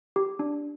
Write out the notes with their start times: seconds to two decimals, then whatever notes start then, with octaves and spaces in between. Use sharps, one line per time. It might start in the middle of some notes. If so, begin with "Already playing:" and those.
0.16 G4
0.39 D4